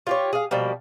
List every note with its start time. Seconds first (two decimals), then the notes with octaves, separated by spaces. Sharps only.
0.07 F4 G4 C#5
0.33 G#4 F5
0.51 B2 F3 G3 A#3